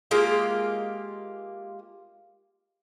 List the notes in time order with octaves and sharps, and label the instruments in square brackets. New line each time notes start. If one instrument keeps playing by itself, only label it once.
[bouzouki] G#3 A#3 F4 G4